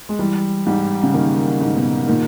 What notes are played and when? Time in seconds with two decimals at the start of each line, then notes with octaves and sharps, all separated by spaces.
0.09 G#3
0.19 E3 G3
0.66 G#2 G3
1.03 C#3
1.14 D#3 A#3
1.61 G#2
1.76 B2
2.08 A#2 D#3